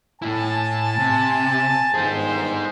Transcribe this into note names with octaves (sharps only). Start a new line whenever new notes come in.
A2 E4 G#5 A5
C3
G1 D#3 D#4 G#4 C5